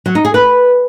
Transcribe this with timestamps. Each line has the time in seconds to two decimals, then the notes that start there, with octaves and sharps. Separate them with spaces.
0.06 F#3
0.15 D#4
0.25 G#4
0.34 B4